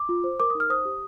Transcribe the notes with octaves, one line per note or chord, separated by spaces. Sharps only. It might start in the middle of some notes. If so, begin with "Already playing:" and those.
Already playing: D6
F4
C5
A#4 D6
D#4 D#6
F6
C5 D#6
G4